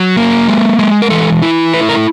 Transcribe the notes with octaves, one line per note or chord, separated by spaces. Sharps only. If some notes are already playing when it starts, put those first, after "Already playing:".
Already playing: F#3
A#3
G#3
G#3
A#4
E3 A4
E4
A3 B4
A#4